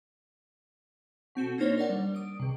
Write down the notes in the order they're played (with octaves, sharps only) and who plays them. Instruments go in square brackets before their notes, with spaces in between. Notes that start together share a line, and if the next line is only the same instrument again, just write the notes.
[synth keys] B2 C4 F#4 A4
A#3 D4 D#4 C5 C#5
A#4 D5 F#5
G3
D#6 D7
C#2 C3